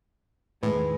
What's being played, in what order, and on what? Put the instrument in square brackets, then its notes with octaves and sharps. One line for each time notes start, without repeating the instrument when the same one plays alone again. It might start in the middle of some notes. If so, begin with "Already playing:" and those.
[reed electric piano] E2 D#3 B4 [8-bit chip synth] A2 [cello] G#3